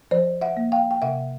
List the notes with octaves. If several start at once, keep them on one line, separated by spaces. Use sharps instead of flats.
F3 C5 D5
E5 F#5
A#3
F5 G5
G5
C3 E5 F#5